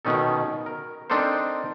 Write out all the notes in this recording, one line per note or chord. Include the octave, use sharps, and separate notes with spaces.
B2 D#3 C#4 D#4 A4
A#4
C4 D4 D#4 A4 A#4 C5